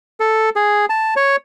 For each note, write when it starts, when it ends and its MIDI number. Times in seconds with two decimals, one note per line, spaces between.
0.20 0.50 69
0.56 0.85 68
0.89 1.14 81
1.16 1.36 73